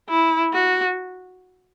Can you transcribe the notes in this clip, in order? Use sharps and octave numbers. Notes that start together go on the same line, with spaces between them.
E4
F#4